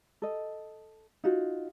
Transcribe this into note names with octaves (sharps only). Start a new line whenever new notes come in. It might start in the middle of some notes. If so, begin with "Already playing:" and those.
A4 D#5
D#4 F4 F#4